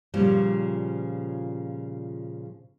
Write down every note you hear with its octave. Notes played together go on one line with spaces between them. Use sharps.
A#2 C#3 F3 G3